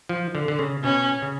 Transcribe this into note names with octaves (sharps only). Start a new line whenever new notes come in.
F3
D3
D3
C#3
B2 C#4
C#3